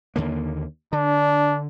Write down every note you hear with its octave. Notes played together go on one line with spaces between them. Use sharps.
D#2 D3 A#3
D3 D4